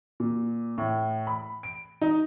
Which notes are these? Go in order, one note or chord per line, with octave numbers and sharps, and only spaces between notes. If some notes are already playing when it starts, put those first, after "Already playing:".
A#2
A2
B5
D7
D#4